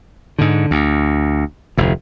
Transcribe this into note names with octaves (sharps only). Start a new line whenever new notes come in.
G#2 D3
D2
F1 D2